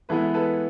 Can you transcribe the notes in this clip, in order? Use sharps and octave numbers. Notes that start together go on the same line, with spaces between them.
E3 G#3 B3 E4 A4 B4
A4 B4